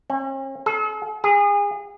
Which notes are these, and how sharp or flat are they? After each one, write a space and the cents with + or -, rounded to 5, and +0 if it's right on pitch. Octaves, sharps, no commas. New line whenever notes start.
C#4 -45
A4 -45
G#4 -30